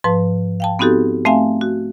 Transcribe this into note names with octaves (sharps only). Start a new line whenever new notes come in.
G#2 F3 B4 A5
F5 G5 A5
B3 C4 D#4 F#4 G4 A4
A3 C4 E5 F5 G#5
F#4